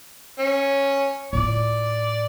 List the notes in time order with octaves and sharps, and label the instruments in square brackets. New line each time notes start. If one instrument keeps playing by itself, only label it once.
[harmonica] C#4
[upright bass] A2 F4 [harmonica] D5